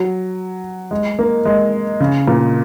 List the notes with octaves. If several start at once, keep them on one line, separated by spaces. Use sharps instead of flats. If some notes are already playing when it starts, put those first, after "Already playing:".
Already playing: F#3
G#3
A#3
G#3
C#3
A#2